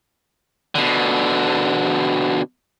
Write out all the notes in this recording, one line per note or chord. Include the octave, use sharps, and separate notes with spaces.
B2 D3